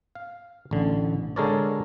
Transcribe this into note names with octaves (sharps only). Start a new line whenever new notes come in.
F5
A1 D3
D3 G#3 A4 A#4 C#5 D5